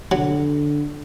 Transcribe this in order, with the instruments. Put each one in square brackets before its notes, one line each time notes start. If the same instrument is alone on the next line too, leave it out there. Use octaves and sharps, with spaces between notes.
[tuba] D3 [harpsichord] F#3